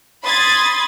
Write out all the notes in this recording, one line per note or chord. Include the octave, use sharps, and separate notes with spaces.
B5 C6 D#6 G#6 A6